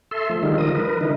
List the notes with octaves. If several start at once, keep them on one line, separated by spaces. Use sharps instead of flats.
A4 E5 C6
F3 A3
D3 D#3 G3 G#3 D#4 F4
F3 A#4 D#6
A#4 B4
D3 E3 D#4